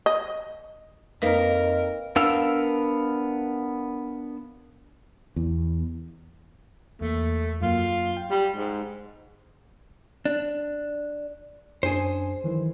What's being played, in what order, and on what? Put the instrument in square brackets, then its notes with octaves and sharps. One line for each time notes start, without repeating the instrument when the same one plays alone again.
[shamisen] D#5
[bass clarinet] F2 [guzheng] A#3 D#4 [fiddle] A#4 [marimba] B4
[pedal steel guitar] B3 D4 A#4 F5 E6
[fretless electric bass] E2
[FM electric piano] E2 A#3 [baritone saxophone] A3
[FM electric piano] F#2 F#3 A#3 [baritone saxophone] F4
[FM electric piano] G5
[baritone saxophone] G3
G#2
[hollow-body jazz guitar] D4
[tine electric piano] F#2 D4 G#5 [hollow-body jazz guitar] G#4 C5
[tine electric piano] D#3 E3 F#3